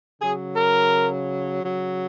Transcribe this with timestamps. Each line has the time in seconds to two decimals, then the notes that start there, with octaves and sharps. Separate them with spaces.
0.21 C#3 F#3 G#4
0.56 A#4
1.61 C#3 F#3